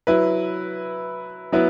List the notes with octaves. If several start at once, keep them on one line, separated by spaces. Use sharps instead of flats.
F#3 E4 B4
F#3 B3 E4 B4